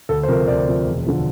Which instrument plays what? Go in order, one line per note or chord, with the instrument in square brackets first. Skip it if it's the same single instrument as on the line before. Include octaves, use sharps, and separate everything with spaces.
[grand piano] D2 A4
C5
C3 F3 A#4
D2 D5
C3 F3
E1
D3 F3